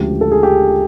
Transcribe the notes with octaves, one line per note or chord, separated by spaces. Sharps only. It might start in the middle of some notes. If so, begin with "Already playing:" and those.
Already playing: D2 C#3 F3 G#3 G4
A4
G#4
G4